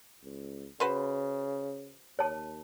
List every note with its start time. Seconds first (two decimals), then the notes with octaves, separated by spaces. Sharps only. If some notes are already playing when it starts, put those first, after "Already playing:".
0.23 C#2
0.80 C#3 F#4 B4 C5
2.19 D#2 C#5 A5